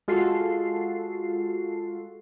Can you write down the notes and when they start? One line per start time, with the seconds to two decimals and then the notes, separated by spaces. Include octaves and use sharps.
0.08 G#3 F4 F#4 A4 C7